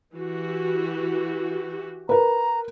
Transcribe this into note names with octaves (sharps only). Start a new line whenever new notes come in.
E3 F#4 G4
A#4 B4 A#5